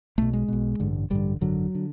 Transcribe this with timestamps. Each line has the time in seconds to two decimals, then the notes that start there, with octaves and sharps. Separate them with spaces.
0.18 B1 B2 A3
0.33 G#3
0.48 B1 B2
0.80 A1 G2 D3
1.10 A1 G2 D3 G3
1.41 G#1 F#2 D3 F#3
1.75 D3